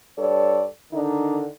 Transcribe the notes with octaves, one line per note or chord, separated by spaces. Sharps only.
G2 A4 C#5 D5
D3 D#3 D4 D#4